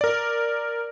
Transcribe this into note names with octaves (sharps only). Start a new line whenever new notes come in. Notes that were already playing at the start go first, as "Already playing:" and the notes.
A#4 D5